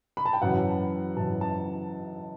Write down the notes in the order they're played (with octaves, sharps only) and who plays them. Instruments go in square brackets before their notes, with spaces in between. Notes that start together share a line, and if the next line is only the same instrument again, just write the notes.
[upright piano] B5
A5
G5
F#2 E3 F#5
F#2 E3 A5
A5